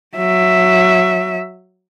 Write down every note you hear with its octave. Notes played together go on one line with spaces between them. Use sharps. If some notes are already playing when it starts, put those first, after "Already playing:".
F#3 E5